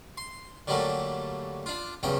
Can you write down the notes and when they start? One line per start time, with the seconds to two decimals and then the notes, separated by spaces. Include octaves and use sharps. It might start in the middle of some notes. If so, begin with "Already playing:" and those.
0.17 C6
0.68 D3 F#3 G3 A3 A#3
1.66 D4 F4
2.03 E2 G2 C#3 F#3 G5